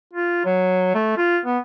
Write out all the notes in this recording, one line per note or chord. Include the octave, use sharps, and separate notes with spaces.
F4
F#3
A3
F4
B3